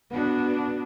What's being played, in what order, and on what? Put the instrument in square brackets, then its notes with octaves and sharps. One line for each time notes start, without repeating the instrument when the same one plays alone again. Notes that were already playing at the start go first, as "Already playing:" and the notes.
[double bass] B3 [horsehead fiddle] D4 F#4